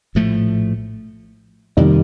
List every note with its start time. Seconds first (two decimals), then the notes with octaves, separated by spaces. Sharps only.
0.15 A#1 A2 F3 A3
1.77 F2 C3 D#3 F3 G3 A#3